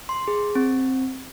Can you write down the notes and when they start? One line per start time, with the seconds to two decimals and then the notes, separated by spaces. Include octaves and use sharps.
0.09 C6
0.28 G#4
0.55 C4